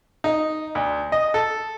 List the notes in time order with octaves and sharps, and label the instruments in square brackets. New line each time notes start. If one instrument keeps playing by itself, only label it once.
[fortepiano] D#4
D2
D#5
A4